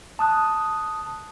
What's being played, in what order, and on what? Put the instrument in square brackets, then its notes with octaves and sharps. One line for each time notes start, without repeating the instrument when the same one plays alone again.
[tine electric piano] A5 D#6 F#6